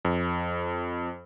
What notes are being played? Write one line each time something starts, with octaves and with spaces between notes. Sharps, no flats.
F2